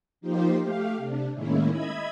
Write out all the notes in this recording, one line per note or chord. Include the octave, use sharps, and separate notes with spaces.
F3 A#3 D#4 F4 G4 C5
A3 G4 F5
C3 D4
A2 D#3 G#3 A#3 C#4 E4
D#5 E5 B5 G#6